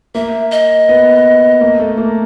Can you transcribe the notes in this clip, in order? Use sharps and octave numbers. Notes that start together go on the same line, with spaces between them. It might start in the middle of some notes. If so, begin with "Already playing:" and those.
A#3 E5
D#5
B3
A#3
A3
A#3